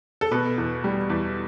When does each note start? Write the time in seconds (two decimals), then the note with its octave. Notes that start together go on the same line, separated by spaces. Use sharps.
0.21 A4
0.31 B2 B4
0.58 E2
0.84 G3
1.10 E2